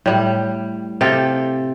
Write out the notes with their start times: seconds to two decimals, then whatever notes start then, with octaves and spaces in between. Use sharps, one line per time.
0.06 A2 G3
1.01 C3 A4 F5 G5